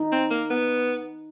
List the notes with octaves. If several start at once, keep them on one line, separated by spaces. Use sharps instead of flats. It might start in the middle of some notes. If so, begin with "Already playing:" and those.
Already playing: D#4
C4
A#3
B3